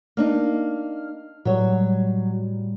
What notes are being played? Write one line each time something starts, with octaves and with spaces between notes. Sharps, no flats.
A#3 D4 D#4 F6
A2 F#3 G3 C#5